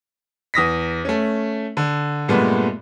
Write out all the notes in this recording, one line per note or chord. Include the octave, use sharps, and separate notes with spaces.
E2 D#6 A#6 B6
A3 C#4
D3
G2 A#2 G#3 A3 B3